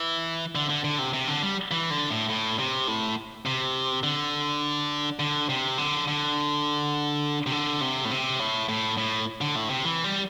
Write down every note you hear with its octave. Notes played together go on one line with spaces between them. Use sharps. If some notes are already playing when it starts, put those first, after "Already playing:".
Already playing: E3
D3
D3
D3
C3
C3
D3
G3
E3
D3
A2
A2
C3
A2
C3
D3
D3
C3
D3
D3
C3
D3
C3
A2
C3
A2
A2
A2
D3
A2
C3
E3
G3